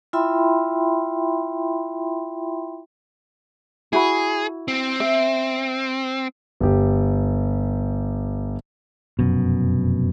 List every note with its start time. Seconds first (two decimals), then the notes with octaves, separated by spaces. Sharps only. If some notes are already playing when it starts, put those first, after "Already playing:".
0.13 E4 F4 E5 G5 B5 C6
3.93 E4 F#4 G#4 B5
4.68 C4
5.00 E5
6.61 G1 G4
9.19 F1 F#2 B2